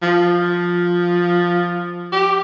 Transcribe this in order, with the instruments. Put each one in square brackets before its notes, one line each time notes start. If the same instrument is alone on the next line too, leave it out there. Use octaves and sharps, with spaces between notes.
[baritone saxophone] F3
G4